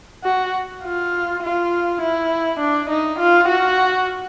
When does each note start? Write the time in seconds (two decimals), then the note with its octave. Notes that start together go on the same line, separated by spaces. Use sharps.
0.24 F#4
0.84 F4
1.42 F4
2.01 E4
2.60 D4
2.90 D#4
3.19 F4
3.48 F#4